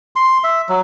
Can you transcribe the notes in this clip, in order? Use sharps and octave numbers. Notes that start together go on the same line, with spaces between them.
C6
E5
F#3